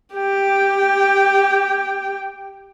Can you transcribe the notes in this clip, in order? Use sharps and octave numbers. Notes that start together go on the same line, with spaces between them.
G4 G5